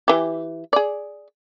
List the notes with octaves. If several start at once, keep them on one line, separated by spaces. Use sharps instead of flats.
E3 G4
G#4 D5